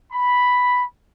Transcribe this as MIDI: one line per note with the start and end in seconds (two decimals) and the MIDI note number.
0.12 0.84 83